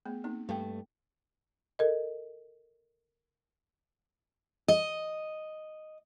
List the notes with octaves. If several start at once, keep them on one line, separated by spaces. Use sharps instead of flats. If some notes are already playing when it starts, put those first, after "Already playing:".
A3 B3 G#4
A#3 C4 D#4
G2 A3 F5 G5
A4 A#4 D#5
D#5